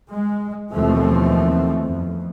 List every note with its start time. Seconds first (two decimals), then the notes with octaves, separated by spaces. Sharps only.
0.10 G#3
0.73 D#2 B2 E3 F3 A3 C4
1.85 F2